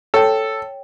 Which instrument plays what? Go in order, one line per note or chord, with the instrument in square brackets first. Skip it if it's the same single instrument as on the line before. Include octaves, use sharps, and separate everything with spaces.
[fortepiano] A4 [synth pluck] C#5 G5